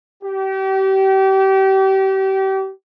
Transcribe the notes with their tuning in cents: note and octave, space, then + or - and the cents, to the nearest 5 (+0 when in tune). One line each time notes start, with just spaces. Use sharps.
G4 -30